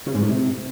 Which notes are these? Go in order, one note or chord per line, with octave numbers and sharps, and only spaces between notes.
C#3
G#2
A2
C3